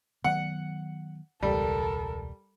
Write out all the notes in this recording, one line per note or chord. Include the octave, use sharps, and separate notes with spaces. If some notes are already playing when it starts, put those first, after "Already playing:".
D#3 F#3 B3 F#5
E1 C#2 G3 A4 A#4